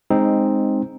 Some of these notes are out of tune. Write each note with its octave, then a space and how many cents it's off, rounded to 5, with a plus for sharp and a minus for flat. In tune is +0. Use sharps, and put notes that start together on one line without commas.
G#3 +0 C4 +5 D#4 -5